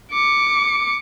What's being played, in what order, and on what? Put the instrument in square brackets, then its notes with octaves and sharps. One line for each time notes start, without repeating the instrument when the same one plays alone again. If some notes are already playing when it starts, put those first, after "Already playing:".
[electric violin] D6 C#7